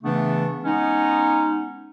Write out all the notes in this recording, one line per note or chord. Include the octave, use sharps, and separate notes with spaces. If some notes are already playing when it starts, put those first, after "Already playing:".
C#3 E3 A3 B3 D4
G#3 B3 C#4 D#4